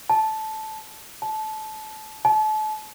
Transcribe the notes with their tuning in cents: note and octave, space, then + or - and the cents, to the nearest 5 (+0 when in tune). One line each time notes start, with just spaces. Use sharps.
A5 -10
A5 -20
A5 -35